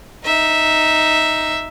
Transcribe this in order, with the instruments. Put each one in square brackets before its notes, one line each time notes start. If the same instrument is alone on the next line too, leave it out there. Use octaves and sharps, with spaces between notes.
[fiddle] D#4 E5